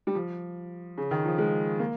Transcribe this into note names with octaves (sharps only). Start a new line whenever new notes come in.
G3
F3
C#3
D#3
F3
G#3
A#3